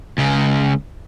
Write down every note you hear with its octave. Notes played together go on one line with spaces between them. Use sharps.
C#2 C#3